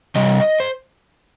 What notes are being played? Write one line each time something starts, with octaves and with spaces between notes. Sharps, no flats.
C3 G3 D#5
C5